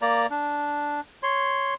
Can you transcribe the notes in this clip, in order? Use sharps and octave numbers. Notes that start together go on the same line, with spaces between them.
A#3 D5 A#5
D4
C#5 C6